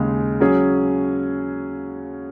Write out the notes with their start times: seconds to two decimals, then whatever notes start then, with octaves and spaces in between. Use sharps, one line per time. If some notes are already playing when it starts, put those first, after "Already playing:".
Already playing: D#2 C#3 G#3
0.40 F#3 C#4 G#4